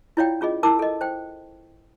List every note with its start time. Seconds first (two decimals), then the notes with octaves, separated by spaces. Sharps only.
0.17 E4 F4 C#5 D5 F5 G5
0.41 C#4 F4 G#4 D#5
0.63 E4 A#4 A5 D6 E6
0.79 A4 D#5
1.01 C5 G5